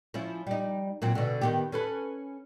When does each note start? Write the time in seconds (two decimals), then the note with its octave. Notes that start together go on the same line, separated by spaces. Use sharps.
0.14 F3 C#4 E4
0.47 G3 D#4
1.02 A#2 F#3 C4
1.15 B2 D3
1.41 D#3 B3 G4
1.72 C#4 A4 B4